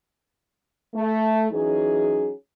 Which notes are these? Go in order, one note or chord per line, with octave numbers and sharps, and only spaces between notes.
A3
E3 F#3 C#4 D#4 G#4